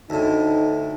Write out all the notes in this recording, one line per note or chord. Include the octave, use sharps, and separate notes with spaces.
D2 A2 D#4